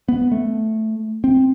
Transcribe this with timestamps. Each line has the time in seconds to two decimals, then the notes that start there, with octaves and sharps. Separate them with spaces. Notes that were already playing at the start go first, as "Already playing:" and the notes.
0.08 B3
0.32 A3
1.24 C4